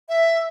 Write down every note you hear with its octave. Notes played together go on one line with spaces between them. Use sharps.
E5